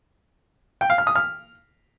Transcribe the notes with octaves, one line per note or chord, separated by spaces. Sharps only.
G5
F5
F6
D#6
F6